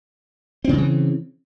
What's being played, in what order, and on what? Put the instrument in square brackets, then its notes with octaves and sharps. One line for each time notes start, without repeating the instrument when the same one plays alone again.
[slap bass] C4
C#3
G3
E3